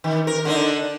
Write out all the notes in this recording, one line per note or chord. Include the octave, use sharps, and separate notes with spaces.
D#3
A#4
D3 D4 D#4